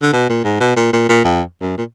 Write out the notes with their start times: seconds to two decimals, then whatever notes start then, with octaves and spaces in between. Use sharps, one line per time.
0.02 D3
0.13 B2
0.29 A#2
0.44 G#2
0.60 B2
0.76 A#2
0.93 A#2
1.09 A#2
1.24 F2
1.61 F#2
1.78 A#2